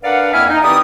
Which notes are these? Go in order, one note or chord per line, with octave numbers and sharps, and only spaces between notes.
D4 A#4 B4 D5 F5 F#5
F2 A#3 E4 E5 G#5 F6
D#4
E3 C4 E4 G4 D5 D#6